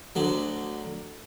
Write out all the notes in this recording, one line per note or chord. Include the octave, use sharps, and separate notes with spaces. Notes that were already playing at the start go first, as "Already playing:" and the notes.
D2 D3 F#3